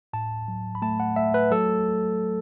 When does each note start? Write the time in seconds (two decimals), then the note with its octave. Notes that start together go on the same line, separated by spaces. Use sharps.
0.13 A2 A5
0.48 F#3
0.75 B5
0.82 A3 A5
1.00 F#5
1.16 A3 E5
1.34 B4
1.51 F#3 A4